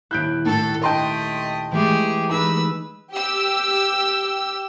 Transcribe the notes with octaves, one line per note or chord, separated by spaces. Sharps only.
D#1 E4 F#6 G6 D7
A2 A4
A3 D#5 G5 A5 C6
E3 G#3 A3 G4 G#4
D#4 G4 G#4 B4 E6
G4 E6